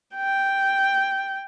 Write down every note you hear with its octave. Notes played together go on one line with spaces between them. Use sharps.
G5